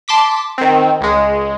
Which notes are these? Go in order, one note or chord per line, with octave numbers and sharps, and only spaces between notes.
A5 C6 D6 B6
D#3 C4
C#2 G#3